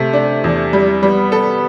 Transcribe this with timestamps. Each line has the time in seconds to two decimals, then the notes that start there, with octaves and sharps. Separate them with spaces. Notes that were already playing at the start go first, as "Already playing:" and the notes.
Already playing: C3 A3
0.13 D4
0.44 E2
0.73 G3
1.03 G3 B3
1.32 A4